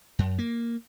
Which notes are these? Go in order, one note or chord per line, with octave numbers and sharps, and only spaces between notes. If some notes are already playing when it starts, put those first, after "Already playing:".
F#2
A#3